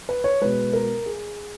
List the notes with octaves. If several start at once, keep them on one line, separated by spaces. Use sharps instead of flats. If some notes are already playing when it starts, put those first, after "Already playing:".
B4
C#5
B2 G#3 B4
A#4
G#4